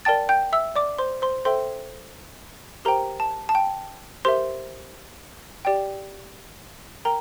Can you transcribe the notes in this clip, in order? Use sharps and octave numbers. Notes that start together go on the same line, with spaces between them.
A#4 D5 G5 A5 A6
G5 G6
E5 E6
D5 D6
C5 C6
C5 C6
A4 C5 E5 G5 C6
G4 A#4 C5 G5 A#5
A5
A5
G5
G4 A#4 C5 E5 C6
G4 D5 G5
A#4 G5 A#5